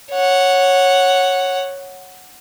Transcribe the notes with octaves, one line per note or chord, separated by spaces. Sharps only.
C#5 F#5